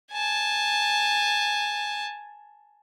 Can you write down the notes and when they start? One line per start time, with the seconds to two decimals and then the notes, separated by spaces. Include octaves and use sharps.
0.12 G#5 A5